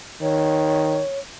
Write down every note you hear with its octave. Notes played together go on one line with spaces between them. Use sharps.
D#3 C#5